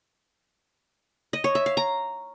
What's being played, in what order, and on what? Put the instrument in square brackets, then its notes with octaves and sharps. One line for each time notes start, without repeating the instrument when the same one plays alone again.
[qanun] D#5
C#5
E5
F5
A#5